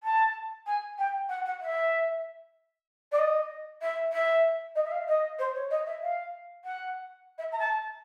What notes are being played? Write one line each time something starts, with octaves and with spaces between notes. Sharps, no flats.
A5
G#5
G5
F#5
F#5
E5
D5
D#5
E5
E5
D#5
E5
F5
D#5
C5
C#5
D#5
E5
F5
F#5
E5
A#5
A5